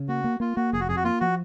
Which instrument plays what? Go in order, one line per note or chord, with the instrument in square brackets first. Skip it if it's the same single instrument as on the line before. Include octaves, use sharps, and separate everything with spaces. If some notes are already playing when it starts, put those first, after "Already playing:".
Already playing: [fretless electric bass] C#3
[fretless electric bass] A#3 [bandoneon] F#4
[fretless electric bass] A#3
[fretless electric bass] A#3 [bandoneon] F4
[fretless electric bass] A#3 [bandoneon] F#4
[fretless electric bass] F1 [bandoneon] G#4
[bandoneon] F#4
[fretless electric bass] F2 [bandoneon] G#4
[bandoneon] F#4
[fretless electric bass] A#3 [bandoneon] F4
[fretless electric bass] F3 [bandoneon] F#4